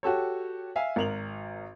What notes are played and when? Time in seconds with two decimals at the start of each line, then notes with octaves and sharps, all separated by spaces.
0.03 F#4 G4 A4 C#5
0.76 E5 F5 G#5
0.96 G#1 A#4 F7 F#7